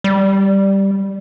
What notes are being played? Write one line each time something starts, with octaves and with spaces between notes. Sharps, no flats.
G3